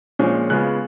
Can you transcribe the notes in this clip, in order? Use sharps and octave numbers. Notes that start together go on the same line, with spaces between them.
A#2 F3 G#3 C#4
C#3 G#3 B3 F4 F#6